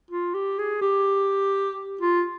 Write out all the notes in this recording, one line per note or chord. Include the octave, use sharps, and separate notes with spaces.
F4
G4
G#4
G4
F4